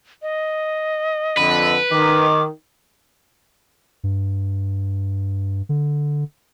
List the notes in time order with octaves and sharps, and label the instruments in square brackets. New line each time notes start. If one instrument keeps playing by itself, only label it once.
[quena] D#5
[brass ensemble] F2 D3 [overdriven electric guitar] B4
[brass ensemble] D#3 [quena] D6
[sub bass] G2
D3